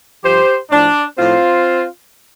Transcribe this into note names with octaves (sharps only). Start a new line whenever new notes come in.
G2 F3 G4 C5
A2 F3 D4
A2 F3 C4 F4